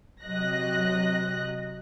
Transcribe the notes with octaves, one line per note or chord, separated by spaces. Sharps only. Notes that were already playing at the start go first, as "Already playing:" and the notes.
C3 F#3 D#5 F#6 A#6